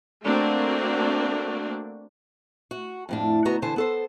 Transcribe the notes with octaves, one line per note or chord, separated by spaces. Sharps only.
A3 A#3 C4 D4 F#4
F#4
F2 A2 D4
D2 B3 D#4 F#4 A#5
E2 D3 E3 C5 A5
B3 A4 C5